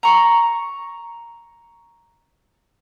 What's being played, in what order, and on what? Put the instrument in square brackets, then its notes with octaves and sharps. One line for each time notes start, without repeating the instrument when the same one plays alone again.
[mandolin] A#5 C#6